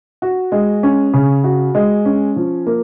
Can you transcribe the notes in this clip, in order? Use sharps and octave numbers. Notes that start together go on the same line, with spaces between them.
F#4
G#3
C#4
C#3
F#4
G#3
C#4
F3
A#3